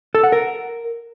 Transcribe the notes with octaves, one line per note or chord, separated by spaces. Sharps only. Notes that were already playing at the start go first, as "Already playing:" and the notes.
A4
F#5
A#4